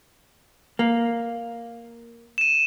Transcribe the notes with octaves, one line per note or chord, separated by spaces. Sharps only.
A#3
D#7 E7